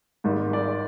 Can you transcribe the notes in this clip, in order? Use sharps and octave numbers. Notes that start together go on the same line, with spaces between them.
G#1 G#2 G3
D5